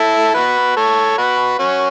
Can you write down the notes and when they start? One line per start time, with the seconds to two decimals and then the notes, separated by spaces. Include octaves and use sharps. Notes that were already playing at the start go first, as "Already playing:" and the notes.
Already playing: E4 A4
0.34 F#4 B4
0.77 A4 C#5
1.18 F#4 B4
1.59 C#4 F#4